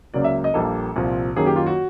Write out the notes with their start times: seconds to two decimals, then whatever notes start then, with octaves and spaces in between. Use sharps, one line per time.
0.14 C#2 C#3 F#3 A#3 D5
0.24 E5
0.44 D#5
0.54 A#1 A#2 G3 A#3 A4
0.96 C2 A#2 F3
1.36 F#2 D#3 F#3 A#3 G#4
1.46 G4
1.56 F4
1.66 F#4